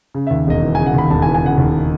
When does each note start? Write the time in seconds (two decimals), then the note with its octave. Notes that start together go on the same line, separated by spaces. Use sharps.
0.15 C#3
0.27 D#2 E5
0.47 E1 D#5
0.62 E3
0.75 C#3 G#5
0.86 F#5
0.94 D#2 B5
1.10 E1 A5
1.22 G#5
1.27 E3
1.34 G#5
1.42 C#3 F#5
1.58 D#2